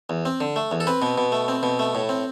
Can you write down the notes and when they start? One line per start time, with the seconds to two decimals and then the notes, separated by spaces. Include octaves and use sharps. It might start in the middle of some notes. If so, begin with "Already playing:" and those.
0.10 E2
0.25 C4
0.41 D3
0.56 A3
0.71 E2
0.80 A4
0.87 C4 B4
1.02 B2
1.18 B2
1.32 A3
1.48 C4
1.63 B2
1.79 A3
1.95 A2
2.09 C4